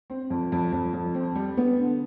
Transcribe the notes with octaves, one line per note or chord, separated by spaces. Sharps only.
C4
F2
F2
F2
F2
C4
G3
B3
D3